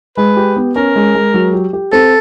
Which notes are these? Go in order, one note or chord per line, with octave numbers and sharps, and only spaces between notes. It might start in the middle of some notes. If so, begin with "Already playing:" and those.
G#3 B4
G4
B3
C#4 A#4
G#3
G#3
F#3
G4
G4
C4 A4